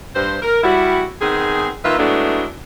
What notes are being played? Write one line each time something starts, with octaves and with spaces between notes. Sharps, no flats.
G2 C5
A#4
G3 E4 F#4
D#3 B3 C4 G#4
D#3 A#3 F4 B4 E5
F#3 G#3 A3 B3 D4 E4